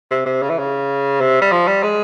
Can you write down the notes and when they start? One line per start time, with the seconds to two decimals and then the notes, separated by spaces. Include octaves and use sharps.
0.11 C3
0.26 C3
0.42 C#3
0.50 E3
0.58 C#3
1.21 C3
1.42 G3
1.52 F3
1.67 G3
1.83 G#3